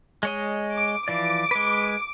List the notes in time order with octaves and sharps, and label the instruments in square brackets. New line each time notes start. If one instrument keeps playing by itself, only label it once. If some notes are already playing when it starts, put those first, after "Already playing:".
[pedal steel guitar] G#3 C#5 D#5
[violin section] D6
[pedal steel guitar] E3 F3 D5 [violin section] D6
[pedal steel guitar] G#3 B4